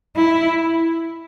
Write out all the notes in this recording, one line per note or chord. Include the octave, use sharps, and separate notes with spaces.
E4